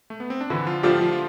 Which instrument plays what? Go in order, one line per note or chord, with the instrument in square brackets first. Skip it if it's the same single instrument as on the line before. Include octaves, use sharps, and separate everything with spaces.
[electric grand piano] A3
B3
C4
D4
[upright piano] D3 [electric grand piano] E3 E4
[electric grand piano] F3 F4
[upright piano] F3 A3 D4 F4 [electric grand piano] G3 G4
[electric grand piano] F3 F4
F4